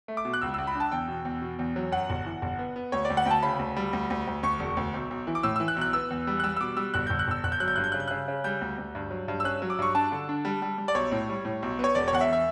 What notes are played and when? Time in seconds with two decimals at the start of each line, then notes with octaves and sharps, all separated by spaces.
0.08 A3
0.17 D6
0.25 B2
0.34 F#6
0.41 C#2 E6
0.54 C#2 E6
0.67 B5
0.75 D4
0.80 A5
0.92 E2 G5
1.08 B2
1.25 E2
1.42 B2
1.59 E2
1.76 F#3
1.92 F#2 F#5
2.10 G1
2.26 E3
2.42 G1
2.59 B3
2.76 B3
2.92 D2 C#5
3.05 D5
3.10 D2
3.17 F#5
3.26 D2 G5
3.31 A5
3.43 C#3 B5
3.59 D2
3.77 G3
3.93 D2
4.10 D2
4.27 D2
4.43 D2 C#6
4.59 E1
4.77 D2
4.93 B1
5.11 B1
5.27 E3
5.35 D6
5.43 A2 E6
5.56 E3 E6
5.68 F#6
5.76 B1
5.81 F#6
5.93 B3 E6
6.10 E2
6.27 G3
6.40 F#6
6.43 G3 E6
6.56 E6
6.60 B2 D6
6.77 G3 E6
6.94 G1 F#6
7.07 G1 G6
7.19 F#6
7.28 G1 E6
7.44 G1 F#6
7.52 G6
7.60 F#3 F#6
7.68 G6
7.76 G2 F#6
7.84 G6
7.92 C#3 F#6
8.00 G6
8.08 C#3 F#6
8.28 C#3
8.44 G3 G6
8.61 D2
8.78 D2
8.95 G2
9.11 F#3
9.28 G2
9.40 E6
9.44 C#4 F#6
9.62 F#3
9.70 D6
9.79 G2 C#6
9.95 D4 A5
10.12 D3
10.29 D4
10.45 G3
10.62 G3
10.78 G3
10.88 D5
10.95 B1 C#5
11.12 A2
11.29 G3
11.45 A2
11.62 B1
11.79 B3 C#5
11.95 E1 D5
12.08 C#5
12.13 E2 F#5
12.21 E5
12.32 E5